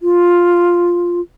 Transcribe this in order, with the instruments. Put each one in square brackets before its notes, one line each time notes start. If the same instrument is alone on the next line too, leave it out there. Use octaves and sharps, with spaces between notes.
[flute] F4